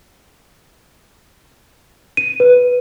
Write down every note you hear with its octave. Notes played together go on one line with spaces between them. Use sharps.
D#7
B4